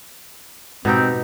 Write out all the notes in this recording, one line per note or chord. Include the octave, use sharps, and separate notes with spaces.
G#2 B2 C4 D#4 G4